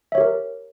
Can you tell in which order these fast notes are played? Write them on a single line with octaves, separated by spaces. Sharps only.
E5 C#5 G4 A#4